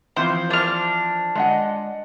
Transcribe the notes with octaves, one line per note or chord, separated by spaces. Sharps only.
E3 F3 C4 C5
D4 F6
G#3 D#5 F#5